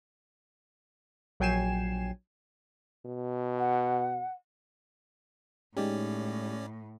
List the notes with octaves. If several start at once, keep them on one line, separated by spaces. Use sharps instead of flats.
A#1 F#3 G5 G#5 C7 E7
B2
F#5
A2 G#3 C#4 D#4 G4 D5